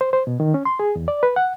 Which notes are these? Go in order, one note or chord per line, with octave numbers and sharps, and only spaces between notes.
C5
C5
B2
D#3
C#4
C6
G#4
E2
D5
B4
F#5